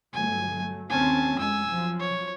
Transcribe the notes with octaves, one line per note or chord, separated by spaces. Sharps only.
G1 F#3 A3 G#5
F#3 A3
D#2 C4 C#4 G#5 A5
F2 G#3 G#5 E6
F3 F#3
C#5